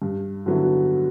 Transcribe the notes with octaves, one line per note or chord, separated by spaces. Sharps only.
G2
D3 F#3 B3 E4